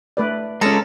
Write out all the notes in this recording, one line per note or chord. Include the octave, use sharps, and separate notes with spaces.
A3 B4 D5
G#3 C#4 A4 A#5